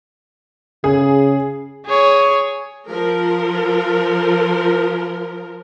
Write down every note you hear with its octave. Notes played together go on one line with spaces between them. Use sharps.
C#3 G#4
G#4 C#5
F3 A#4